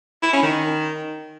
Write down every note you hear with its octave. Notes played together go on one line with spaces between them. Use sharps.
E4
C#4
D#3